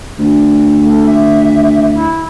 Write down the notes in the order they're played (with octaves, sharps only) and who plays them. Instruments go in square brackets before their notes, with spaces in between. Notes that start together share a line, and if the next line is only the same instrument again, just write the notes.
[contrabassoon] D2
[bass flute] A3
E5
E4